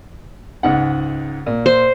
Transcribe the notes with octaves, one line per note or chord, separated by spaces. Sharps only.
C#2 G#2 F#5
A#2
C5